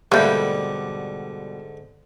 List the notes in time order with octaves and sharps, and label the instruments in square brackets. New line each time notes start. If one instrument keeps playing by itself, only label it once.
[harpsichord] G#2 D3 [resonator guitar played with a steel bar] B2 G3 [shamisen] A3 A#3